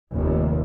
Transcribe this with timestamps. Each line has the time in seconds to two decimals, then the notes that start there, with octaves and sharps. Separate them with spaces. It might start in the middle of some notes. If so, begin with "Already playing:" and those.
0.14 F1 D#2